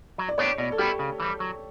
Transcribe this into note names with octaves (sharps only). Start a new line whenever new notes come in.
F#3
D5
B3 D4 G4 C#5
B2 D5
A4
G3 B3 E4 G4
C#3
E3 G3
F#3